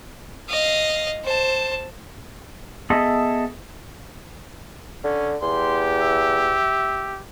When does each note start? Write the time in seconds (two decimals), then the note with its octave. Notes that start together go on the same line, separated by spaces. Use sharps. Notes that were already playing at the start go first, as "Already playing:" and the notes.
0.49 D#5 F5
1.24 C5 A5
2.90 B3 G#4 A4 D#5 E5
5.04 D3 C#4
5.42 E2 G4 C6
6.01 E5